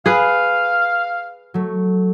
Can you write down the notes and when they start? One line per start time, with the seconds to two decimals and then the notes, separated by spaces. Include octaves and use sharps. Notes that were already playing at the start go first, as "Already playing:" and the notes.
0.06 G#4 B4 F5
1.54 F#3 A3